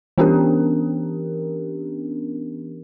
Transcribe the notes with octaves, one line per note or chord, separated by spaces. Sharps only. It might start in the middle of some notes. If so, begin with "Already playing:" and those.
E3 B3 C#4 D4 G4 A#4